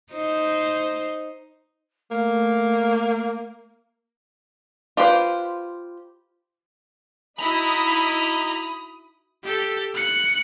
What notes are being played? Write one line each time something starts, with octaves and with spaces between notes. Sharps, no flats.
D#4 C5
A3 A#3
F4 G4 B4 C5
D#4 E4 F#4 D#5 A#5 B5 D#6
G4 A4
F#6 C#7